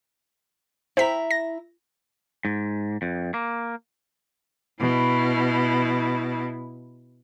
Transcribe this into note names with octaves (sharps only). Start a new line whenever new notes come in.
E4 C5 E5 G5 A#5 B6
A#6
G#2
F2
A#3
B2 E4